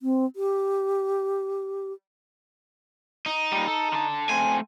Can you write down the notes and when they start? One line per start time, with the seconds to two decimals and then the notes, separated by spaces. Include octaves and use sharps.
0.01 C4
0.36 G4
3.26 D#4
3.52 A#2 G3
3.68 A4
3.92 D3 A5
4.29 A3 C4 G#5